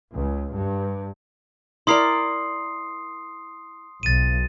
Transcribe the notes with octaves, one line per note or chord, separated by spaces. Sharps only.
C#2
G2
E4 A#4 D5 C6 D#6 C7
B1 A6 D#7